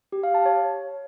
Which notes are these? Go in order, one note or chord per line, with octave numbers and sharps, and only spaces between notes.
G4
F5
A5
C#5